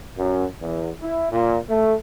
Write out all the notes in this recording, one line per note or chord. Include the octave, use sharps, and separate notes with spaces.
F#2
E2
E4
A#2
A3